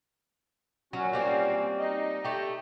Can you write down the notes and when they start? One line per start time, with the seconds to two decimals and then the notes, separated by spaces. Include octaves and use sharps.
0.93 A#2 F#3 C#4 F#4
1.13 G3 A#3 C4
1.78 D#4 D#5
2.24 A3 G4